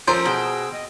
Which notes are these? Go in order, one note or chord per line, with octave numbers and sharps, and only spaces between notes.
F3 C4 C#4 A4 A#4 C5 E6
B2 G#4 G5 E6
D#5